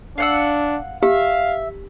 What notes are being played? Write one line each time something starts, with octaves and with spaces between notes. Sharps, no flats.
D4 F5 F#5 E6
G4 E5 F5